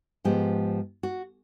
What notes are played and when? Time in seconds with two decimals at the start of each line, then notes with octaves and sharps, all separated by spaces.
0.24 G#2 F3 G#3 B3 G4
1.03 F#4